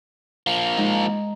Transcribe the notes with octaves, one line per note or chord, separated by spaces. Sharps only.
F3 A#3
G#3 D#4